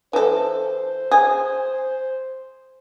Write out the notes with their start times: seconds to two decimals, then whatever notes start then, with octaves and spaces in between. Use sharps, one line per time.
0.13 E3 A4 C5
1.12 G#4